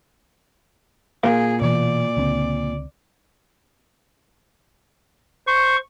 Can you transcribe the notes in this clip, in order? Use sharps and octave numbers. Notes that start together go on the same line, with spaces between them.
A#2 G#4 A#4 F5
B2 E3 D5
C#2 D3 C4
C5 C#6